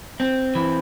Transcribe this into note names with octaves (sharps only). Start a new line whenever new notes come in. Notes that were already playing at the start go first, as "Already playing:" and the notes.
C4
E3